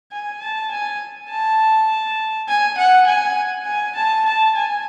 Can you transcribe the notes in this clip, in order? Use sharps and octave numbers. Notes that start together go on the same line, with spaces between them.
G#5
A5
G#5
A5
G#5
F#5
G#5
G#5
A5
A5
G#5